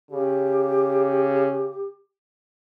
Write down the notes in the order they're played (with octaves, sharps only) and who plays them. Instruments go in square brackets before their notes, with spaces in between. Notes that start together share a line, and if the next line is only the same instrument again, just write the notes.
[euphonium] C#3 [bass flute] G4